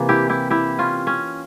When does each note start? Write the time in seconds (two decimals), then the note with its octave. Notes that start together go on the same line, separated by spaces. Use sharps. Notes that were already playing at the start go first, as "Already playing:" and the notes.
Already playing: C3 E3 A#3
0.09 E4 G4
0.29 E4 G4
0.50 E4 G4
0.79 C#4 F4
1.07 C#4